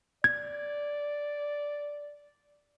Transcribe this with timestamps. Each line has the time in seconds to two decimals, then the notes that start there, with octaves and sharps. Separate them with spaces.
0.24 D5 G#6